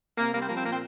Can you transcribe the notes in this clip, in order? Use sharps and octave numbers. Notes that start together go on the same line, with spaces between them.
C3 A#3
G3 A#3
C4
F3 A#3
C4
A#2 A#3
C4